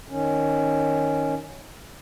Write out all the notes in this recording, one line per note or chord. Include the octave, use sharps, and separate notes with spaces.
D#3 C#4